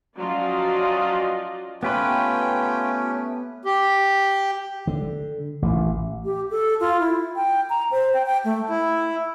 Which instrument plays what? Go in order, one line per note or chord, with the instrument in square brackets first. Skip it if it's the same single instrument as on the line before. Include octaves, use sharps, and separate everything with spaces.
[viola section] F3 F#3 C#4 F4 D5 D#5
[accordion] A3 [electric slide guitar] B3 G4 B4 [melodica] C#4 [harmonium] F4 G5
[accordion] G4
[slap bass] D3
A1
[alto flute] G4
A4
F4
E4
G5
A#5
C5
G5
G5
A3
[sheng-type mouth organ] E4